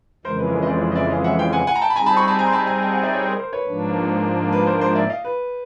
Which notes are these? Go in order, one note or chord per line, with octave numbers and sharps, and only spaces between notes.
F2 C#3 E3 G#3 A#4 C5
B4
A#4
B4
D#5
C5 D5
C5 D5
D#5
D5 E5
D#5 F5
E5 F#5
F5 G5
F#5 G#5
F#5 G#5
A#5
G5 A5
B5
G3 C4 D#4 G#4 G#5 A#5
A5 B5
B5 C#6
A5 B5
G#5 A#5
C6
A5 B5
G#5 A#5
G5 A5
F#5 G#5
D5 E5
C#5 D#5
A#4 C5
A#4 C5
B4 C#5
G#2 F3 A#3 D4
B4
A#4 C5
A#4 C5
D5 E5
D#5 F5
B4